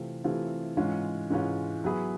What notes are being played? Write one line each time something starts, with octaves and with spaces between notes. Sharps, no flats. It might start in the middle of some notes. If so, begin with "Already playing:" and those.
Already playing: C3 E3 A3 C4 F4
C3 E3 A3 C4 F4
G#2 E3 G#3 C#4 F4
G#2 E3 G#3 C#4 F4
F#3 B3 E4 G#4 B4